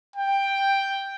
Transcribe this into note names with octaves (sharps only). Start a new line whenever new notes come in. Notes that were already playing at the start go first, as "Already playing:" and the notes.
G5